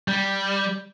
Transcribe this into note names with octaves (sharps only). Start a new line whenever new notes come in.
G3